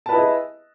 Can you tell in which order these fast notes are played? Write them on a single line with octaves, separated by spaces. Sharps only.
A5 B4 E4 D#5 G#4